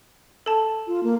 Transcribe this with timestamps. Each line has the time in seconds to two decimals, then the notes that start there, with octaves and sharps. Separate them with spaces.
0.46 A4 A5
0.87 F4
1.03 A#3